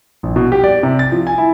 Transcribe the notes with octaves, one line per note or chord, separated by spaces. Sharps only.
A#1
B2
G4
D5
C3
A6
F3
G#5
E4